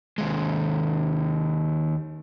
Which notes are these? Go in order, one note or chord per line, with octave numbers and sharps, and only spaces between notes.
D#2 G#3